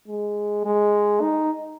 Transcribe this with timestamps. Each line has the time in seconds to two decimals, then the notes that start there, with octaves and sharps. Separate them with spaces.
0.08 G#3
0.65 G#3
1.21 D#4